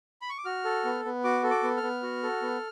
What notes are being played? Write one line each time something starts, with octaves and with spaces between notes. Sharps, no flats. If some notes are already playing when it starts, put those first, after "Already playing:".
B5
C#6
D6
F#4 F6
A4
B3
B3
F#4 D6
A4
D6
B3
F6
B3
F#4
A4
B3